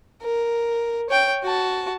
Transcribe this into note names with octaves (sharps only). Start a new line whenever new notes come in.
A#4
C#5 G5
F#4 A5